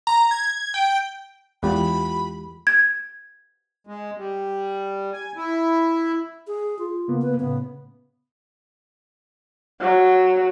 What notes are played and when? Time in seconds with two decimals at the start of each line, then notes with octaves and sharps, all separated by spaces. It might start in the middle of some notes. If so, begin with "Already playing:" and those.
0.07 A#5
0.31 G#6
0.74 G5
1.63 E2 G#3 F4 G4 B5
2.67 G#6
3.87 G#3
4.17 G3
5.13 G#5
5.36 E4
6.47 G#4
6.79 F4
7.08 C#3 A#3 B3
7.22 B4
7.40 A2 C#3 B3
9.81 F#3